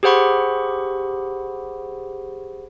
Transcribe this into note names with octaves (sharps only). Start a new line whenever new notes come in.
G4 G#4 C5 F#5 B5 C#6